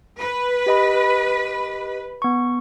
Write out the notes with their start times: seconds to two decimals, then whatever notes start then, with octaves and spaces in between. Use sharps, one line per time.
0.19 B4
0.66 G4 D#5 B5
2.22 B3 C#6